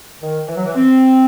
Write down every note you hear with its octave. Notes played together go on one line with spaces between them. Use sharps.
D#3
E3
F#3
E3
C4